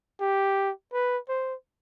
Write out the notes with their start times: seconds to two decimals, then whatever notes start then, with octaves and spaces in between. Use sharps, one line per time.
0.21 G4
0.93 B4
1.29 C5